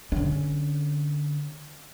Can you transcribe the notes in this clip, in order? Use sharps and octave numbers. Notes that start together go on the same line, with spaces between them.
D3 C#4